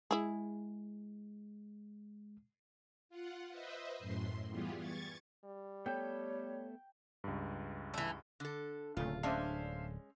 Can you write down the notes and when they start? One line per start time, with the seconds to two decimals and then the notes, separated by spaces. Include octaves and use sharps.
0.11 G#3 E4 G#4
3.09 F4 F#5
3.49 B4 C5 D#5 E5
3.99 F#2 A2 C6
4.49 E3 G3 B3 F4 G4 G#4
4.79 C#6 G#6 A6
5.45 G3
5.86 A3 B3 A4 C#5 G5
7.24 C#2 G2
7.94 E3 A3
8.40 D3 A4
8.97 D1 A#2 C#3 A3 F4
9.23 G#3 C#4 D4 C5 E5 F5